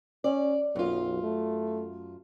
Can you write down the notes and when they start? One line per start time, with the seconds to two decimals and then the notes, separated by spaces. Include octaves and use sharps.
0.24 C#4 D5
0.76 B1 F#2 F4
1.23 A3